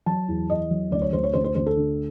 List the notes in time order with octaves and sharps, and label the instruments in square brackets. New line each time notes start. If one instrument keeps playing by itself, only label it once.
[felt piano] F#3 A5
E2
E2 D#5
F#3
D2 D5
C#5
D2 C5
C#5
D2 C5
C5
D2 C5
A4
D3